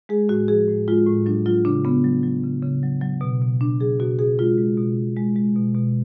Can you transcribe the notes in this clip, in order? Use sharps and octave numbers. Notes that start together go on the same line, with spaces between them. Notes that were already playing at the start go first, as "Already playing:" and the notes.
G#3 G#4
A2 F#4
F3 G#4
A2
G#3 F4
A2
F#3 D4
F#3 F4
C#3 D4
C#3 B3
F#3
F#3
C#3
C#3
F#3
F#3
B2
B2
F#3 D4
F#3 G#4
B2 F#4
B2 G#4
G#3 F4
G#3
B2
B2
G#3
G#3
B2
B2